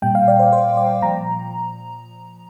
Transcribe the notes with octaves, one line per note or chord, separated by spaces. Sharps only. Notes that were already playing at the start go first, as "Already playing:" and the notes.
A#2 G3 G5
F5
D5
C5
C5
D5
A#2 F3 A#5